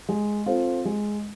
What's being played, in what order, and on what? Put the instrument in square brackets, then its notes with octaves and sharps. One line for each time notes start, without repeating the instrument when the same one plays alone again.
[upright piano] G#3
C4 F4 A4 C5
G#3